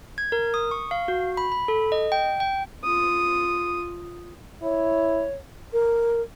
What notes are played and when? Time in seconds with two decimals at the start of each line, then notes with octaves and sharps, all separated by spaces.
0.18 G#6
0.32 A#4
0.54 D#6
0.71 C#6
0.91 F5
1.08 F#4
1.37 B5
1.52 B5
1.68 A4
1.92 D#5
2.12 G5
2.40 G5
2.84 F4 D#6
4.62 E4 C#5
5.73 A#4